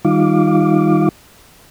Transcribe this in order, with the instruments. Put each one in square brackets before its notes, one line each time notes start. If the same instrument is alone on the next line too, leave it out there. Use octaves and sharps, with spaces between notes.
[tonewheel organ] D#3 G3 D#4 F4 F5 D6